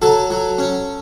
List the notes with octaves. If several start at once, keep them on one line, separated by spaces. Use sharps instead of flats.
F#3 A4
F#3
C#4